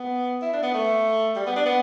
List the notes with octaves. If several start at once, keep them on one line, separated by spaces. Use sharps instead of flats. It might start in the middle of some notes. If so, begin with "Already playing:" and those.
Already playing: B3
E4
D4
B3
A3
G3
B3
D4
B3